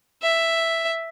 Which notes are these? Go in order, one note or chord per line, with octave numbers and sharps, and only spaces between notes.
E5